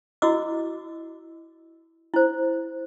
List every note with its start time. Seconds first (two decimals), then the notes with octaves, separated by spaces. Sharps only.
0.22 E4 F#4 D#5 D6 E6
2.14 E4 C5